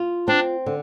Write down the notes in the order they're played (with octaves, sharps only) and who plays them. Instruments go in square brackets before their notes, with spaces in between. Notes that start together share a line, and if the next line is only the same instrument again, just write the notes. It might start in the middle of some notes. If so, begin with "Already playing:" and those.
Already playing: [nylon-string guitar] F4
[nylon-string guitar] C4 [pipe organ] D4
[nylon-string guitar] D3